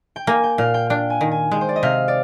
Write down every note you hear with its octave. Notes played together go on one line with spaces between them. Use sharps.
G5
A#3 G#5
G5
A#2 F5
G5
D4 G5
G#5
D#3
G#5
G#3 G5
C5
D5
D#5
C3 F5
D5